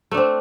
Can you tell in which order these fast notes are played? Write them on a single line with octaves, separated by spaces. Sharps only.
A3 D4 C4